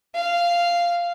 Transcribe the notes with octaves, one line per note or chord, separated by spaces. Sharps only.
F5